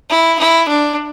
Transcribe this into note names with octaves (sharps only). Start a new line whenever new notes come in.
E4
E4
D4